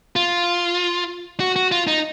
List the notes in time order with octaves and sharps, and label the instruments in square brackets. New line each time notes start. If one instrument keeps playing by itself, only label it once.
[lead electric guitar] F4
F#4
F#4
F4
D#4